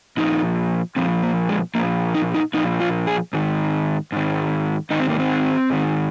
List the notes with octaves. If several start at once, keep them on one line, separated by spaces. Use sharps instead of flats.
A#2 F3 D#4
A#2 F3 C4
A#3
G#3
A#2 F3 A#3
D#4
D#4
A#2 F3 D#4
F4
G#4
G#2 D#3
G#2 D#3
G#2 D#3 D#4
C4
A#3
C4
G#2 D#3